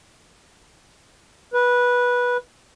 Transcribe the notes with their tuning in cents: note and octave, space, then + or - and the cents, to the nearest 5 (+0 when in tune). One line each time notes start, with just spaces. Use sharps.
B4 -15